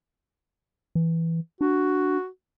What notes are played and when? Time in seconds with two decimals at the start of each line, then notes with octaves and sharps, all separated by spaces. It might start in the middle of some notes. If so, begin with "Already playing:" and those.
0.95 E3
1.61 D4 F#4